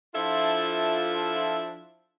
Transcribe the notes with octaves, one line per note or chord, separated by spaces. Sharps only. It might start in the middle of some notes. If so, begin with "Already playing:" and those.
F3 D4 E4 F4 A4 E5